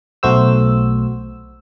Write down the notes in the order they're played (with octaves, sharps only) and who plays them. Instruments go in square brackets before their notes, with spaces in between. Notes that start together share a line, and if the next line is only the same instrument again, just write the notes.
[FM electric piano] B1 A3 F#4 C5 E6